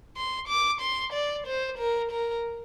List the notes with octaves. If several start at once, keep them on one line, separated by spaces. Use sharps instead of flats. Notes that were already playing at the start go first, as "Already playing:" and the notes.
C6
D6
C6
D5
C5
A#4
A#4